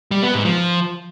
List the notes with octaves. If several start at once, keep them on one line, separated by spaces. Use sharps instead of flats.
G3
B3
G#2
F3